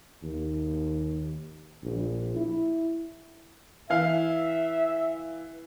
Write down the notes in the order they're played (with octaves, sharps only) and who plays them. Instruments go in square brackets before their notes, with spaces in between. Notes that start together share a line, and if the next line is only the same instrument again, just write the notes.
[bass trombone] D#2
A#1
E4
[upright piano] E3 F5 [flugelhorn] E5